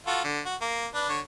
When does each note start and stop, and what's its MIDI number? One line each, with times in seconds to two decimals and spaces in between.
0.07 0.21 65
0.07 0.21 66
0.07 0.21 69
0.24 0.40 50
0.45 0.55 66
0.61 0.86 58
0.94 1.09 62
0.94 1.09 71
1.09 1.20 50
1.09 1.20 73